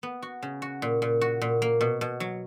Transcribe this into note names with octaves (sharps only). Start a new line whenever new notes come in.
B3
F#4
C#3
F#4
A#2
A#2
F#4
A#2
A#3
B2
B2
F#3